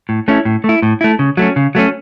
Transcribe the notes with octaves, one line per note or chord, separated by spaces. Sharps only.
A2
A3 C#4 E4
A2
A3 E4
A2
A3 E4
C#3
F#3 A3 C#4
C#3
F#3 A3 C#4